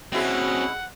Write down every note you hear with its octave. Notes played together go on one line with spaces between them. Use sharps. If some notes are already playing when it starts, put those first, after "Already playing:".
B2 C4 C#4 E4 F#4 G#4 F#5